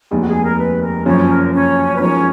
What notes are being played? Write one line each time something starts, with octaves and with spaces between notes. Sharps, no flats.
F1 D#2 D#3 G#3
F#4
G#4
A#4
B4
A#4
F#1 F#2 F3 C#4 C#5
A#4
C#4 C#5
B4
F#2 F3 G#3 C#4 D#4 A#4 C#5